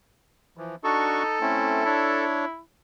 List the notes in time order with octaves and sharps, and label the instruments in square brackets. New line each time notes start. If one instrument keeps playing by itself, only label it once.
[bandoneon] E3 F3
[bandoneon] D4 F#4 C#6 [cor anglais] D#4 [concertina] A4
[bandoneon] A3 C#4 E4 [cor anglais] C4
[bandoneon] D4 C#5 [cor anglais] E4